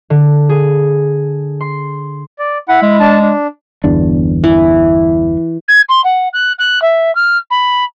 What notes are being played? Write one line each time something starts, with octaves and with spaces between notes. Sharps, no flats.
D3
G#4
C6
D5
E4 F#5 B5
G#3
D4 A5
D4
G1 E2 D4
E3
G#6
C6
F#5
F#6
F#6
E5
F6
B5